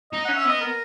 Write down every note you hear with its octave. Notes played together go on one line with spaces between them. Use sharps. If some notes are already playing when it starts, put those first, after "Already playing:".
D#4 D#5
C#4 F#5
E5
B3 D#5
A#4